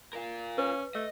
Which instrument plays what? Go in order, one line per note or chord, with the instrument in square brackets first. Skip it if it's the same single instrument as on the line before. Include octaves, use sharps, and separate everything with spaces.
[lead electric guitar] F4 A#4
[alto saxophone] C#4 [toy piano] B4
[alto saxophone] A3 [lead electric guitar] D#5